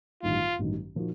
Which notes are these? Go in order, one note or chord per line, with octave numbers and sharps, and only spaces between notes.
A1 G2 D#3 F#3 F4
A1 G2 D#3 F#3
A#2 F3 A#3 D#4 F#4